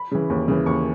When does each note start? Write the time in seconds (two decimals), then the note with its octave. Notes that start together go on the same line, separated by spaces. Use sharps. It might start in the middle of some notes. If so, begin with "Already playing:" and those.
Already playing: B5
0.12 C#3 E3
0.30 D#2
0.48 C#3 E3
0.66 D#2 C#6